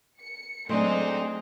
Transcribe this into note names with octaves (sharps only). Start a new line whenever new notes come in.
C#7
F#3 G#3 A3 C4 D4 D#4